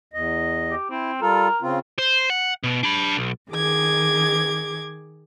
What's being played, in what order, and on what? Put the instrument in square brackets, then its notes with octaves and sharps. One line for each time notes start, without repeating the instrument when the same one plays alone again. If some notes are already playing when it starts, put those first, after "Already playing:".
[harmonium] E2 D#5
[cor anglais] G4
[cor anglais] C4 [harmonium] E4
[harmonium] G3 F4 A4 [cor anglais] A#4
[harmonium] C#3 C4 F4
[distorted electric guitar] C5
F#5
B2
D4 B5
B1
[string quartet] D#3 G#4 D6 G#6